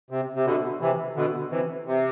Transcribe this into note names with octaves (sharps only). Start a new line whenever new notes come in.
C3
C3
B2 D3
C3 E3
B2 D3
C3 E3
C3